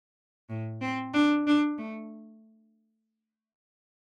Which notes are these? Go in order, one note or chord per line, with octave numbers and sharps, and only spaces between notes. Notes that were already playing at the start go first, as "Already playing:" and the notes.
A2
C4
D4
D4
A3